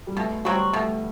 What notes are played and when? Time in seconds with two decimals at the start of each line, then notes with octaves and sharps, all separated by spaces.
0.07 G3
0.17 B2 A3
0.45 F#3 G3 C4 F#4
0.73 B2 A3